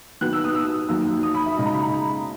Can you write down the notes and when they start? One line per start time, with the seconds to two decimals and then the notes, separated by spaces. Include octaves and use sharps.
0.21 D#3 F#3 B3 F#6
0.33 E6
0.44 D#6
0.55 E6
0.89 F#2 D#3 F#3 A#3
1.23 D#6
1.35 B5
1.46 E5
1.57 C#3 G#3 D#4 D#5
1.66 A#5
1.74 B5
1.82 A#5